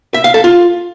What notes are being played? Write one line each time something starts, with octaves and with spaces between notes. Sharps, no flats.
E5
F5
A4
F4